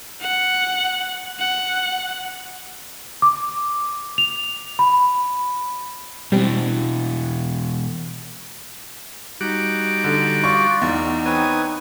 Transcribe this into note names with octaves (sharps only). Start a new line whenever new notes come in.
F#5
F#5
D6
F7
B5
B2 E3 G3 C4
G3 D#4 F#4 D6
D3
F4 D5 C#6
E2 D#4
C4 B4 C#5 G#5 D#6